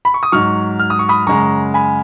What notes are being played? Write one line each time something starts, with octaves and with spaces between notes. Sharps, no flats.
B5
C#6
D#6
G#2 F#3 C#6 F6
F6
D#6
C#6
B5 D#6
F#2 C#3 G#3 A#5 C#6
G#5 B5